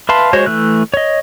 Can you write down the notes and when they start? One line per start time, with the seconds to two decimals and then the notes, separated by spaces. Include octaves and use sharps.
0.09 B4 E5 F5 A5 C6
0.33 G#3 F#4 C5 C#5
0.46 E3 A3 F#6
0.94 C#5 D#5